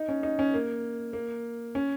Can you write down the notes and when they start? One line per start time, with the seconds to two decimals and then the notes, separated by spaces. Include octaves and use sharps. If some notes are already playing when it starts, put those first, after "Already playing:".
Already playing: D#4
0.08 C#4
0.23 D#4
0.39 C#4
0.54 A#3
1.13 A#3
1.75 C#4